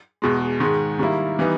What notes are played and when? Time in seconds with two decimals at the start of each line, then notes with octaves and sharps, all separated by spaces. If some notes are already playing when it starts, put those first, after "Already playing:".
0.22 E2 B2 G#3
0.60 G#2 D#3 G#3
0.99 D#3 G3 A#3 E4
1.39 E3 G3 B3 D#4